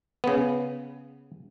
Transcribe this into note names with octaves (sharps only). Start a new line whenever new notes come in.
C#3 B3